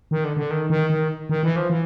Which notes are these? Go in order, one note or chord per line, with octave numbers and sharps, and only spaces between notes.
D#3
D3
D3
D#3
D#3
D#3
D#3
E3
F3
E3